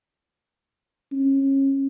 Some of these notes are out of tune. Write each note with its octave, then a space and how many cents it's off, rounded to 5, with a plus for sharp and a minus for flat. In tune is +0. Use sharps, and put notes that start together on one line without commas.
C#4 -30